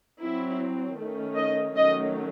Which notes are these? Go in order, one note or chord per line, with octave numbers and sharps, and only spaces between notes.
F#3 C4 E4
D#3 A3 C#4
D#5
D#3 F#3 A3 C#4 D#5